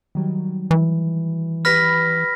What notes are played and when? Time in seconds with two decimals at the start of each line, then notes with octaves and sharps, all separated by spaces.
0.15 D#3 F#3 G3
0.71 E3
1.65 G4 B4 B5 F6 A#6 B6